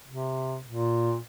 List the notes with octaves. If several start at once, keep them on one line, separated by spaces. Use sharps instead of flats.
C3
A#2